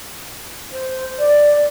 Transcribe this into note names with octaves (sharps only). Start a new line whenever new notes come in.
C5
D5